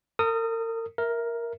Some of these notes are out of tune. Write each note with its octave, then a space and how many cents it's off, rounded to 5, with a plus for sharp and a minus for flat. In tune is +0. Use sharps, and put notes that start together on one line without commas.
A#4 -40 D#6 +0
A#4 +5 E5 +0